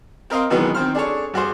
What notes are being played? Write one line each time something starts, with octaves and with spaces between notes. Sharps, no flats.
C4 A#4 D#5 F5 C6
B2 D#3 E3 F#3 G#3 B3
D#3 C4 C5 F6
D4 G#4 A4 C#5
G2 F#4 G#4 C5